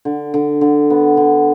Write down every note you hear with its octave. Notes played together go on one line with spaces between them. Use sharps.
D3
D3
D3
B3
D3